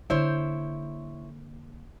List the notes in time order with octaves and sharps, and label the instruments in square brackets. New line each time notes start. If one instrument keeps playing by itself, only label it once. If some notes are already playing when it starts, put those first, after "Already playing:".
[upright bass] D3 A#3 [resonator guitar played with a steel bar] E4 C5 C#5